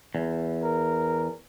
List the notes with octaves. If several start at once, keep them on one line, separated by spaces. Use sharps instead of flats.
E2
A#4